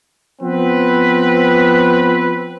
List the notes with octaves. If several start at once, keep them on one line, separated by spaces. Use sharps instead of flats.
F3 B3 C4 B4